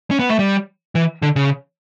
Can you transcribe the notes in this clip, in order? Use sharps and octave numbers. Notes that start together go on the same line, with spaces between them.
C#4
B3
A3
G3
E3
D3
C#3